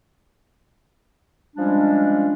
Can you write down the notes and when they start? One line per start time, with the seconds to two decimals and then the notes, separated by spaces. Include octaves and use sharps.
1.56 F3 G3 G#3 C#4 D4